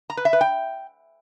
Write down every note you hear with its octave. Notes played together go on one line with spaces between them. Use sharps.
A#5
B4
E5
B4
G5